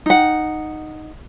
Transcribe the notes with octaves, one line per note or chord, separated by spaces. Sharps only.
D#4 F#5